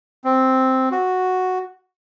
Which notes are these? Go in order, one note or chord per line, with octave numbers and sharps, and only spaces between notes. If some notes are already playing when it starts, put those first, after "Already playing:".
C4
F#4